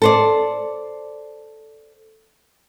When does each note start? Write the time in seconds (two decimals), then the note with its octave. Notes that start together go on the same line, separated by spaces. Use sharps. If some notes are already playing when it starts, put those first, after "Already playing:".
0.02 A4 C5 D5